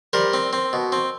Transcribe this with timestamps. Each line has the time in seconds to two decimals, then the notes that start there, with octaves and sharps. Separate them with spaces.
0.13 G3 A#4 C5
0.33 C4
0.53 C4
0.73 B2
0.92 C4